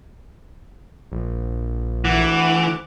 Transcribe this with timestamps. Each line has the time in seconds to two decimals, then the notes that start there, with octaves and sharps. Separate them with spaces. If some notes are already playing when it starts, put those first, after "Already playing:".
1.12 A#1
2.05 D2 E3 F#5 D6